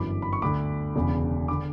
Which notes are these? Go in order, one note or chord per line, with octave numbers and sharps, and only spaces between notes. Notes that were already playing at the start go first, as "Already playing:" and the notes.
Already playing: G1 F#2 E3 B5 D6
B5
C#6
D2 D3 B5 D6
E1 E2 C#3
D3 B5 D6